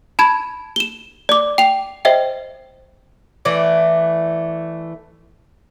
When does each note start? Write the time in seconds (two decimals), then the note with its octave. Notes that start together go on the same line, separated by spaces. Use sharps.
0.19 A5 B5 G#6 E7
0.76 E7 G7
1.29 D5 D6
1.58 G5 F7
2.05 C5 D#5 E5 G5
3.45 E3 A3 D5